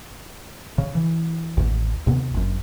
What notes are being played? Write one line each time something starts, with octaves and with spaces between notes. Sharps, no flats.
C#3
E3
A1 D#2
D#2 C3 B3
G1 F#2